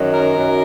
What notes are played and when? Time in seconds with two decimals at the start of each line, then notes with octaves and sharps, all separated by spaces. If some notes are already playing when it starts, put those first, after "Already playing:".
Already playing: F#2 D#3 F#3
0.14 A#4
0.36 F#2 D#3 F#3